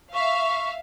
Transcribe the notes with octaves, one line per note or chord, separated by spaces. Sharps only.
E5 F5 C#6